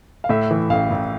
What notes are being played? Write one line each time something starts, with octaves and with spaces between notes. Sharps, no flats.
F5
A2 E5
E3
A1 F5
A1